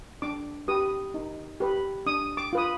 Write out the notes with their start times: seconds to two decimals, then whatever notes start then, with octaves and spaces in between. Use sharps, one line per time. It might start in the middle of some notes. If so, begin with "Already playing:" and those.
0.22 D4 D6
0.68 G4 B4 D#6
1.14 D#4
1.60 G4 B4
2.06 D4 D#6
2.37 D6
2.53 F4 B4 D#6